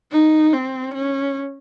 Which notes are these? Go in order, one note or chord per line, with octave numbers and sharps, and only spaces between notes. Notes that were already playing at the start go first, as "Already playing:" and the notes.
D#4
C4
C#4